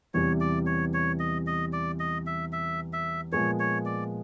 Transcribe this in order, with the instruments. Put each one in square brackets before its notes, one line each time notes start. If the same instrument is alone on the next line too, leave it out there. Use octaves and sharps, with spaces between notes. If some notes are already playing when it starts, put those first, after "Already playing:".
[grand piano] E2 C3 E3 G3 [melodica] C#5
[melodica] D5
C#5
C#5
D#5
D#5
D5
D#5
E5
E5
E5
[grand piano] A#2 F3 G#3 B3 [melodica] C#5
[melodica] C#5
D5